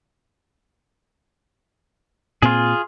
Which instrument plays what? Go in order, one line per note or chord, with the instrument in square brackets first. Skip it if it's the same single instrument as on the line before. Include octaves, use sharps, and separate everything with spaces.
[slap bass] A#2 C4 [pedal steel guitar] F4 G#4